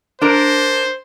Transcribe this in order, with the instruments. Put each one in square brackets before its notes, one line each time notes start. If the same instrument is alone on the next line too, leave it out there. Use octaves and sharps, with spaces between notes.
[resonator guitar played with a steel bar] D4 A#4 [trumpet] C5